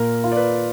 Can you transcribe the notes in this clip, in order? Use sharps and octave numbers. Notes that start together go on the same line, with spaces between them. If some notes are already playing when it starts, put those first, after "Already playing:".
Already playing: A#2 A#4
F4
D5
B4